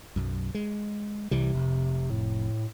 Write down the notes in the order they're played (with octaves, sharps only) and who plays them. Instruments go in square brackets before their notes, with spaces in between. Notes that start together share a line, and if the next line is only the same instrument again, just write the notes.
[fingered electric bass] B1 F#2
G#3
[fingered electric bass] C2 E3 G3 [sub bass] C3
[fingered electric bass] F1
[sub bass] A2